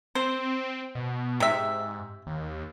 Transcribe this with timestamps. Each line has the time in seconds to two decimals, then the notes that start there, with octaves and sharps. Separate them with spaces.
0.15 C4 C5
0.95 B2
1.40 G#2 C3 E5
2.27 D#2